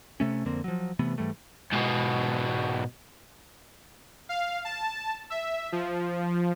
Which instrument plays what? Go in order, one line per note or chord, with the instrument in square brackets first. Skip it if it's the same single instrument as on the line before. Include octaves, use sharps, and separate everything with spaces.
[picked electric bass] C3 A3 C#4
F2 D3 A#3 C4
F3 F#3
C3 E3 A3 B3
G#2 E3 G3 A3
[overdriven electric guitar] G#2 B2
[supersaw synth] F5
A5
E5
F3